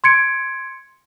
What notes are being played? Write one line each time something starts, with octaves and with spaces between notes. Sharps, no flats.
C6 G#6 C#7 D7